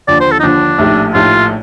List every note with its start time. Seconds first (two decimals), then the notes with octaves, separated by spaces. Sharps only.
0.08 D#2 D3 F3 D5
0.20 C5
0.32 A4
0.40 D#4
0.43 D#2 D3 F3 D4
0.78 A#1 A2 A3 D#4 G4
1.14 A#1 A2 A3 D#4 F4 G4